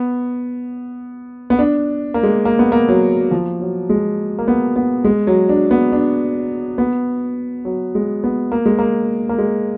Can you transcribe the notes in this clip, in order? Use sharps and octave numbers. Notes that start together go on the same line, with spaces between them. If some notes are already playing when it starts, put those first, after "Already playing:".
Already playing: B3
B3
D4
A#3
G#3
A#3
B3
A#3
F#3
F3
F#3
G#3
A#3
B3
B3
G#3
F#3
D4
B3
D4
B3
F#3
G#3
B3
A#3
G#3
A#3
A#3
G#3